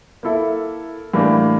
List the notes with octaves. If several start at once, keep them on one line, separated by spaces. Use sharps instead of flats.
A#3 E4 A4 E5
A2 E3 G3 A#3 D4